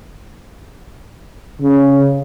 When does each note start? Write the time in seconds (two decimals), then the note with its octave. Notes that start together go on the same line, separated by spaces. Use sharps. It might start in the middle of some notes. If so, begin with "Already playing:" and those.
1.62 C#3